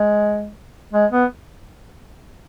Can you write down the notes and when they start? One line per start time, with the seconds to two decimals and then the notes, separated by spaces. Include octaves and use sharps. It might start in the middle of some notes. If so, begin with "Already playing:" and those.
Already playing: G#3
0.93 G#3
1.12 B3